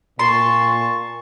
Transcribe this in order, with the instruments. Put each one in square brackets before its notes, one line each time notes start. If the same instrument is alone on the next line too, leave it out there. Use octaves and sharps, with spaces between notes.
[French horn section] A#2 [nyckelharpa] A5 C#6 [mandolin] C6